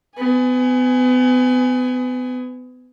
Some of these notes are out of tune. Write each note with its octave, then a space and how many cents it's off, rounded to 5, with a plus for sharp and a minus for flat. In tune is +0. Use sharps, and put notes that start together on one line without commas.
B3 +35 G#5 +0